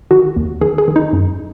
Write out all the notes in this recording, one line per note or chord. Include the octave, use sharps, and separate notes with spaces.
D#3 F#4
D#2
D#3 G#4
G#4
D#3
D#4
F#2